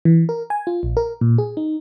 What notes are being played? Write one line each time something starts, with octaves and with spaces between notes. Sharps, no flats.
E3
A#4
G#5
F4
A#1
A#4
A#2
G#4
D#4